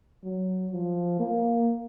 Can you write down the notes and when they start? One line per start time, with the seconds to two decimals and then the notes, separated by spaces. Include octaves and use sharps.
0.23 F#3
0.72 F3
1.19 A#3